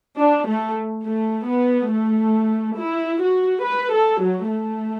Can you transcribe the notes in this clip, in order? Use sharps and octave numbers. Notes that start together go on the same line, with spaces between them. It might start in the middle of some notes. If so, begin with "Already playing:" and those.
D4
A3
A3
B3
A3
E4
F#4
B4
A4
F#3
A3